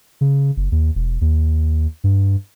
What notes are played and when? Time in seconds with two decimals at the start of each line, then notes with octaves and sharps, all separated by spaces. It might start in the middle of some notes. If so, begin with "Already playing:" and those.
0.21 C#3
0.57 F#1
0.72 D#2
0.95 E1
1.21 D#2
2.04 G2